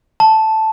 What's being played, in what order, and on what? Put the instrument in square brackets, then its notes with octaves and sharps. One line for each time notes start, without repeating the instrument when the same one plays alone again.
[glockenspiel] A5